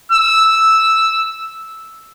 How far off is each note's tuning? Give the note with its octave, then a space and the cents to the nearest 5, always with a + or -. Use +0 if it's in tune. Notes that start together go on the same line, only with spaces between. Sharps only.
E6 -5